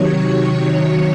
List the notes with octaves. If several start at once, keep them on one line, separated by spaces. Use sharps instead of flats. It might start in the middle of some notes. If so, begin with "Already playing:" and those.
Already playing: C3 D#3 F#3 C#5 C#6
C#5 C#6